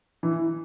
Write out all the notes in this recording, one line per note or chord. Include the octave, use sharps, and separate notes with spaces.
E3